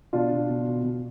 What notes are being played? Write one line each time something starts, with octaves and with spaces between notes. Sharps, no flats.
B2 D4 F4
B2
B2
B2
B2